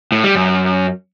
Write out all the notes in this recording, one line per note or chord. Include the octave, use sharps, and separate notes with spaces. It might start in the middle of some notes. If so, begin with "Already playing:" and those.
A2
G3
F#2